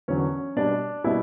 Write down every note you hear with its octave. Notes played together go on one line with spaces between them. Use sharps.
E2 D3 F#3 C#4
B2 G3 D4
B2 G3 E4